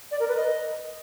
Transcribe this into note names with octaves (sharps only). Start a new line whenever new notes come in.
D5
A#4
B4
D#5